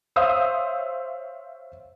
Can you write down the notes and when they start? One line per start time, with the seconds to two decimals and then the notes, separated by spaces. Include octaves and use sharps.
0.16 C5 C#5 E5 F5 D#6 E6